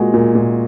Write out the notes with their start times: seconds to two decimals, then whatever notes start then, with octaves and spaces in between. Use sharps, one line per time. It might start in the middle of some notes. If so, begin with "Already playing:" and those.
Already playing: A#2 G#3 F#4
0.14 A#2
0.35 A#2